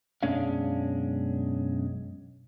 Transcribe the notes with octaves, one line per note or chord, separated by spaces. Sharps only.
B1 F#2 G#3 C#4 D4 F5